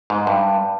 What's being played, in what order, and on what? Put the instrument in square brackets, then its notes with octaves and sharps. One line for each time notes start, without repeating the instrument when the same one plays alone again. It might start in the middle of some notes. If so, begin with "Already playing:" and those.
[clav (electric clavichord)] G#2
G2